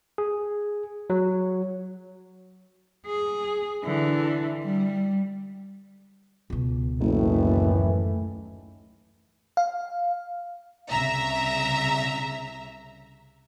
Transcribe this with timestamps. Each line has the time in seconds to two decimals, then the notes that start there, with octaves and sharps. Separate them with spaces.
0.18 G#4
1.10 F#3
3.07 G#4
3.84 D3 E3
4.64 G3
6.50 C#2 B2
7.00 F#1 F#2 A2 D#3 E3 A3
9.57 F5
10.90 C2 C#3 E5 A#5